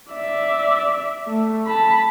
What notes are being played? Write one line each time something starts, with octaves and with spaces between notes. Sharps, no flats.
D5 E5
A3
A5 B5